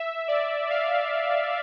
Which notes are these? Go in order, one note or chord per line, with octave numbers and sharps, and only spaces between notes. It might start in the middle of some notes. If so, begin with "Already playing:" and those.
Already playing: E5
D5
F5